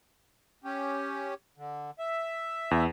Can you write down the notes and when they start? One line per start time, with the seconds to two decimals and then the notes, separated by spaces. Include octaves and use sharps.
0.64 C#4 G4
1.57 D3
1.99 E5
2.71 E2